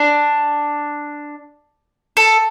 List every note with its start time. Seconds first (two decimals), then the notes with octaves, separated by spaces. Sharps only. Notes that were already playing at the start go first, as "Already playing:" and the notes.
Already playing: D4
2.17 A4